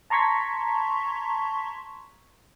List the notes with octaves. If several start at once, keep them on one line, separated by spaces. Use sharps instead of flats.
A5 A#5 C6 C#6 G#6 B6